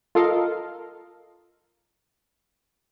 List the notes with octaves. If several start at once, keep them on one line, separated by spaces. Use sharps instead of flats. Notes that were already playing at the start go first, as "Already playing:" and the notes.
F4 A4 A#4 D#5 F5